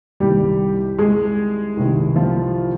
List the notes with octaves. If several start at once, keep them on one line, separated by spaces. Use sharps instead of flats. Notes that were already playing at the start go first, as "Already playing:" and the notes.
C2 C3 D#3 G3 G4
G#3 G#4
C2 C3 D#3
F3 F4